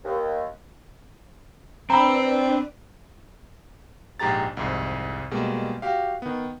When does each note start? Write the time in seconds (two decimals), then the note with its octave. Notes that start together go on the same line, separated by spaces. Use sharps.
0.04 D#2
1.90 C4 D4 B4 D5 G5 A#5 B5 E6
4.20 A#1 G#2 G4 G#4 A#5 A6
4.57 C2 F2 G#2
5.31 B2 G3 G#3 A#3
5.82 F#4 G4 F5
6.22 D#3 B3